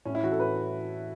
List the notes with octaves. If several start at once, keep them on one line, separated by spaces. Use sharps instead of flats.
A2 C#4
E4
E3 F#4
A4
A2 B4